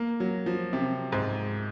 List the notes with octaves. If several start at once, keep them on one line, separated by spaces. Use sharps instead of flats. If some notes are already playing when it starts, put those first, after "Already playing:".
Already playing: A#3
F#3
F3
C3
G#2